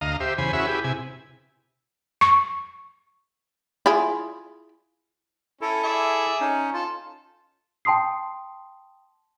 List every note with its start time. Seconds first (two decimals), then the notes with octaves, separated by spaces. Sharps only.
0.01 D2 D#5 F5 A#5
0.20 G4 C5 E5
0.38 E2 C#3 C5 G#5 B5
0.53 C#4 E4 F#4 G#4 E5 B5
0.67 E4 G4 G#4 B4
0.84 C3 E4 G#5
2.21 C#6
3.86 E4 F4 G#4
5.61 C#4 E4 A4
5.84 G#4 D5 E5
6.40 C#4 D#4
6.74 F4 A4
7.85 G5 A5 C6 D#6 C7